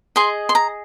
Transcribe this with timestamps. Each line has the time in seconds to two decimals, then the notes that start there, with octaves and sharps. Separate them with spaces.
0.16 G#4 D#5 C6
0.49 C6
0.55 A#5